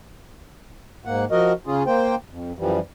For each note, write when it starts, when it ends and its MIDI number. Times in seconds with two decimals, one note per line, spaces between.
1.05 1.25 44
1.05 1.25 58
1.05 1.25 78
1.31 1.53 53
1.31 1.53 66
1.31 1.53 70
1.31 1.53 75
1.67 1.83 49
1.67 1.83 61
1.67 1.83 65
1.67 1.83 68
1.86 2.15 58
1.86 2.15 72
1.86 2.15 79
2.31 2.52 41
2.59 2.79 42
2.59 2.79 52
2.59 2.79 53
2.59 2.79 55